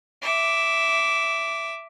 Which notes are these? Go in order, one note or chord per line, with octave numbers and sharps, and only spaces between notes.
E5 D6